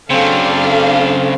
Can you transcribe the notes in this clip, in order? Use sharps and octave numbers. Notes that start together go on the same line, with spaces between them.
C#3 F#3 C4 D4 A4 F5